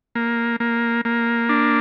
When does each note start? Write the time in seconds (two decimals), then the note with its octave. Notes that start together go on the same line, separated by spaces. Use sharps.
0.15 A#3
0.60 A#3
1.05 A#3
1.49 D4